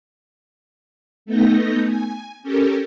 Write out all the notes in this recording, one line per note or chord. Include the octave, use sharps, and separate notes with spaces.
A3 B3 D#4 G6 A#6
G#5
C#4 G4 A4 A#4